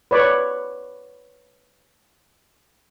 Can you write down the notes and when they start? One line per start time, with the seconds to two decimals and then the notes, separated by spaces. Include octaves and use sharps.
0.11 B4 C#5 D5